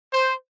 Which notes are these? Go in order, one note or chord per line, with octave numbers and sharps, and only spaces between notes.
C5